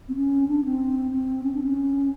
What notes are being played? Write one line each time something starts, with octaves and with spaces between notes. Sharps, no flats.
C4
C#4
D4
C4
C4
C#4
D4
C#4